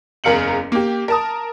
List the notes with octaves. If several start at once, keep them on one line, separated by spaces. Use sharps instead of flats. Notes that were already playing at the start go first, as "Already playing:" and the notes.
F#1 E2 A#4 F5 C#7 F#7
A#3 G4
A#4 A5 D#6